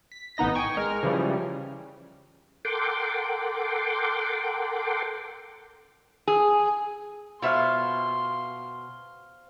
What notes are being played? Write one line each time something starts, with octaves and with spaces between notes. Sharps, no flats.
B6
A1 B3 D#4 D#5 A#6
G5 G#5 C#6
G#3 A#4 F6
C#3 E3 F3 G3
A4 A#4 F#5 G5 C6 D6
G#4
B2 F4 C5 E5 F5 C6 C#6